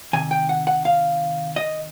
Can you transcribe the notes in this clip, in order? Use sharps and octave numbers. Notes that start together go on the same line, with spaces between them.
C3 D#3 G#5
G5
F#5
F#5
F5
D#5